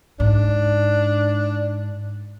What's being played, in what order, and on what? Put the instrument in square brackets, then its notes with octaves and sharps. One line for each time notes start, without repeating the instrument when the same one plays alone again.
[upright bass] G#2 [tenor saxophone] D4